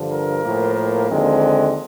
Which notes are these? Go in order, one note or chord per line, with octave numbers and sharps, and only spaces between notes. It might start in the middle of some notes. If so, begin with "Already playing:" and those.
Already playing: G2 D3 F3
A#4
A2 F3 A#3
D#2 D3 F3 G#3 C4